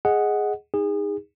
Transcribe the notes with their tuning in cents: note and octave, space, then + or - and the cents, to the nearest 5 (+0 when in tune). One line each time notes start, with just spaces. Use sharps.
G#4 +0 D#5 +0 F#5 +0
D#4 +0 G#4 -30